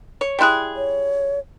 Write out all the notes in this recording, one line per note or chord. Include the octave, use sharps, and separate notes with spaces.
C#5
G3 E4 G#4 G5 C6 F#6
C#5